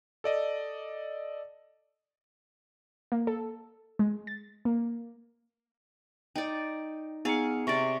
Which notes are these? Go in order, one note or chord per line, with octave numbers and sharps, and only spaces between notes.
A4 D5 D#5
A#3
A4
G#3
A6
A#3
D#4 D5 G5
B3 D#4 G#4 F5 C#7
C3 D5 C#6 A#6